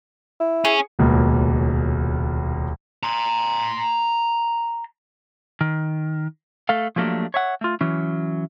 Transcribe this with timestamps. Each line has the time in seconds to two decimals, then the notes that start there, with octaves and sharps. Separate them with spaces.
0.40 E4
0.65 C#4 G#4
0.99 D#1 C#2 B2 A#3
3.03 A#5 C6
5.61 D#3
6.69 A3 A4 F5
6.96 F3 F#3 A3 A#3 D4 G4
7.34 C#5 E5 F#5
7.61 A3 F4
7.81 E3 F#3 C#4